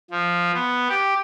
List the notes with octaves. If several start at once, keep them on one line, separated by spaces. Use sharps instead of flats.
F3
B3
G4